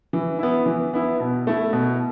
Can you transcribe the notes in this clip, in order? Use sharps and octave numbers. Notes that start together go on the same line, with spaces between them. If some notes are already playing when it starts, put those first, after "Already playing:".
E3
B3 E4
E3
B3 E4
B2
A3 E4
B2